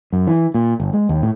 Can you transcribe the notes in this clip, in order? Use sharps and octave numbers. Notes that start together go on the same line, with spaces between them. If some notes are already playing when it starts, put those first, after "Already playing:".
F#2
E3
A#2
G1
G#3
D#2
A2